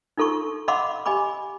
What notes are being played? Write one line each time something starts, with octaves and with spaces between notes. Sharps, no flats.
D#4 F4 A4 C6 C#6
D#5 F5 F#5 B5 C6 D6
G4 D#5 G#5 B5 D6